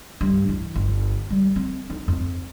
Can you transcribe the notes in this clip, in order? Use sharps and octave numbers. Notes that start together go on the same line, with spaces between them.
G2
E3
G1
G3
C4
D#4
F2